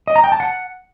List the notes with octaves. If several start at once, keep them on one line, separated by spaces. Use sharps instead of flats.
D#5
A#5
G5
A5
F#5